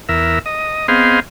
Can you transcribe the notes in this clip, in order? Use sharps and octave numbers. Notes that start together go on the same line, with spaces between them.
E2 A#4 E5
D#5
B3 C4 G#4 C5 D#5 F5